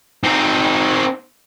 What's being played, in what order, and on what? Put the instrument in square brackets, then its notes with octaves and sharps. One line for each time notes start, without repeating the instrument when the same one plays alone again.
[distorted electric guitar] C4 D#4